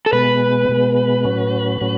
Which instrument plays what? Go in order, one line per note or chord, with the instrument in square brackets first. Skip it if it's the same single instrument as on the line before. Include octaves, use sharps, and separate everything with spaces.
[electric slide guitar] A4
[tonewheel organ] B2 G#3 B3 [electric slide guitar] B4
[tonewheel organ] B2 G#3 B3
A2 F#3 C#4
A2 F#3 C#4